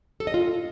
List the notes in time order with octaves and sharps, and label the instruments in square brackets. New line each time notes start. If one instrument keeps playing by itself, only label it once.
[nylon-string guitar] A4
D#5
F4